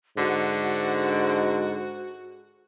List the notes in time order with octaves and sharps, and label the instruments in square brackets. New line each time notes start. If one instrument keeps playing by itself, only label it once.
[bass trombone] G#2 [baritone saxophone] D3 [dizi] F#4